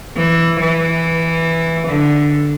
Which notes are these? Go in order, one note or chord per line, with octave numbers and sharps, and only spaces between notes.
E3
E3
D3